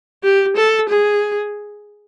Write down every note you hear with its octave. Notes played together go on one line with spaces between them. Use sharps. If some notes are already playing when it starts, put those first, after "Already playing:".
G4
A4
G#4